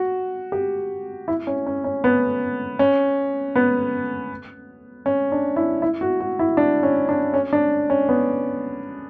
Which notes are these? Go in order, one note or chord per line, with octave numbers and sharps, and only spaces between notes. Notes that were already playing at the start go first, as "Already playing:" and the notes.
Already playing: F#4
G4
E4
C#4
C#4
C#4
B3
C#4
B3
C#4
D4
E4
E4
F#4
F#4
E4
D4
C#4
D4
C#4
D4
C#4
B3